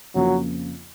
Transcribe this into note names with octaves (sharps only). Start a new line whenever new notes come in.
F2 C#3 F3 F#3 A#3